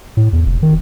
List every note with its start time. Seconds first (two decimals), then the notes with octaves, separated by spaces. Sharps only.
0.17 A2
0.33 E2
0.46 F1
0.62 D#3